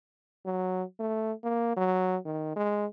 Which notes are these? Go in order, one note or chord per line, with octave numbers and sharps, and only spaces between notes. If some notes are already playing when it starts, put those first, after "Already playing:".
F#3
A3
A#3
F#3
D#3
G#3